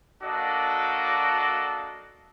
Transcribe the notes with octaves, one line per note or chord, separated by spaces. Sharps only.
A#3 D4 F#4 A4 D5 D#5